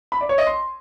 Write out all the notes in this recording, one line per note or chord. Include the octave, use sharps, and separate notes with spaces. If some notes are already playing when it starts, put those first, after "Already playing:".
B5
D5
C#5
D#5
C6